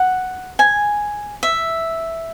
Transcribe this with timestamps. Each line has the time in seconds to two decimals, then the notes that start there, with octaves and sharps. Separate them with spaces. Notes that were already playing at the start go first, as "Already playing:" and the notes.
Already playing: F#5
0.59 G#5
1.43 E5